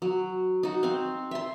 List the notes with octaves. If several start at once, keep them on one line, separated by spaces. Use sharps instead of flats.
F#3
D#4 F#4
C4 F5
E5 C6